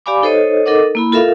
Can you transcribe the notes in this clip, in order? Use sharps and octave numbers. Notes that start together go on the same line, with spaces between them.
G4 D5 F5 G#5 B5 D6
D#4 A4 C5 C#5 D#5
D#4 A4 A#4 D#5 F#5 D6
A#3 E4 B5
F4 A4 A#4 E5 F5